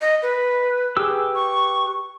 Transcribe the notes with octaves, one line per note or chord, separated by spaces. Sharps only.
D#5
B4
G4 G#4 B4 E6
C#6